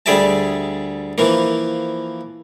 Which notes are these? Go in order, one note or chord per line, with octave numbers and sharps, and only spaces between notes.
D2 G3 G#4 D5 E5 A5
E3 F3 A#3